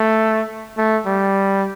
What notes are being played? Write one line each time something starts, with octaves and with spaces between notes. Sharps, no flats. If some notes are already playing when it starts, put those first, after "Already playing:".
Already playing: A3
A3
G3